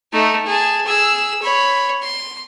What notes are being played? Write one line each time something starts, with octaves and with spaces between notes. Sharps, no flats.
A3 D#4
G#4 A5
G#4 E6
C#5 B5
C6